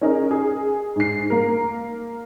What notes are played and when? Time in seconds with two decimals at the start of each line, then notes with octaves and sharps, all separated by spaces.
0.01 C#4 D#4 G#4 A#4
0.31 G#4
0.96 G#2 C7
1.30 A#3 A#4